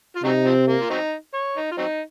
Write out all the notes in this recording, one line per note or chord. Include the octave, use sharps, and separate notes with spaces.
F4
C3 F#3 C4 D#4
F3 C4
A#3
F4
F#3 C4 D#4
C#5
D#4
F4
F#3 C4 D#4